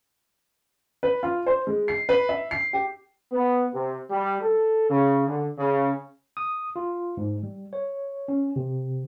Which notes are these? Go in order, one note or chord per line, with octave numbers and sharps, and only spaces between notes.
B4
F4
C5
G#3
C7
B4
E5
C7
G4
B3
C3
G3
A4
C#3
D3
C#3
D#6
F4
G#2
G3
C#5
C#4
C3